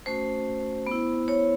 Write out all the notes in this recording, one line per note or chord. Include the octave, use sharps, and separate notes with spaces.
A3 C#4 F#4 C5
B3 E4
C#5